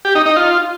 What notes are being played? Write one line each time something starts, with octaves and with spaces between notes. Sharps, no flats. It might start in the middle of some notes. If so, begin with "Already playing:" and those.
G4
D#4
D#4
F4